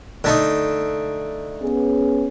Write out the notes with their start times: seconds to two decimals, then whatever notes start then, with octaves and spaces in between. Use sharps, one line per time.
0.24 D3 A3 D#4
1.61 B3 C#4 G#4